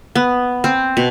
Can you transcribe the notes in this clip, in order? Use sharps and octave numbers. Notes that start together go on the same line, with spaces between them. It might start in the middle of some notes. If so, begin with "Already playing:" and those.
B3
C4
B2